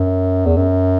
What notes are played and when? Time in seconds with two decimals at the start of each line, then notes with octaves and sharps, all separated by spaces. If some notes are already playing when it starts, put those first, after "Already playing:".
Already playing: F#2
0.46 E2
0.57 F#2